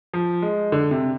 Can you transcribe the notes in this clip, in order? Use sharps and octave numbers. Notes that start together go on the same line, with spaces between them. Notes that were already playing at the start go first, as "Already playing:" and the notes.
F3
G#3
D3
C3